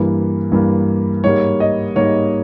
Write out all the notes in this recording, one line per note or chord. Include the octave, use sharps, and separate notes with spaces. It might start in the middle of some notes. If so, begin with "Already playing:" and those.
Already playing: G2 E3 A#3
G2 E3 A#3
G#2 G3 A#3 C#5
D#5
G#2 G3 A#3 C#5